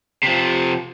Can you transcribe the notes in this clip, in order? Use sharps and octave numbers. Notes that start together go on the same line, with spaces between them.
C3 F3